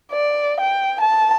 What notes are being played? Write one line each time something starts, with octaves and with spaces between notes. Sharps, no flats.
D5
G5
A5